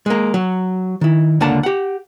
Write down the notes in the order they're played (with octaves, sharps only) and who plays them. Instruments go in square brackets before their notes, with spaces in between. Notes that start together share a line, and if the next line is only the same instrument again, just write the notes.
[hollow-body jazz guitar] G#3 A#3
F#3
D#3 E4
C#2 D3 A#3 F#5 A5
G4 F#5